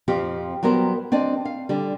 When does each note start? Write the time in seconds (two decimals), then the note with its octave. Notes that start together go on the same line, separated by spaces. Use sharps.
0.08 F2 F3 C4 G4
0.63 F#3 G3 B3 A#4 C5
1.12 C4 D4 D5 D#5
1.45 F5
1.69 D3 G3